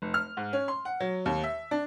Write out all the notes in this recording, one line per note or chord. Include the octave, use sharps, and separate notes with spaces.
F1
F6
G#2
C#4
C6
F#5
F#3
D#2
E5
D4